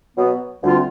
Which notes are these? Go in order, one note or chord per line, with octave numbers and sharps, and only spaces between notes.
B2 F#3 B3
D2 D3 G3 C4 F4